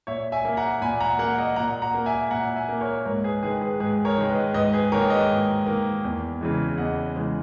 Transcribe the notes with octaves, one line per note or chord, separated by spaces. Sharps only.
A#2 C#5 E5
E5 G#5
A#3
F#5 A#5
A#2 G#5 B5
F#5 A#5
A#3 F#5 A#5
D#5 F#5
A#2 F#5 A#5
F#5 A#5
A#3
E5 G#5
A#2 F#5 A#5
E5 G#5
A#3
A#4 C#5
G#2 A#4 C#5
G#4 B4
D#3 G#3 G#4 B4
G#4 B4
G#2 G#4 B4
A#4 C#5
D#3 G#3
B4 D#5
G#2 B4 D#5
G#4 B4
D#3 A#3 A#4 C#5
B4 D#5
G#2
D#3 A#3
E2
C#3 E3 G#3
E2 D#5 F#5
C#3 E3 G#3